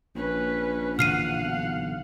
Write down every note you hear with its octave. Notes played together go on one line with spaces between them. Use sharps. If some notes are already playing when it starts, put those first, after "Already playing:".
A#1 C#4 B4
A#2 D3 E3 F5 F#5 F6 C7 D#7
B1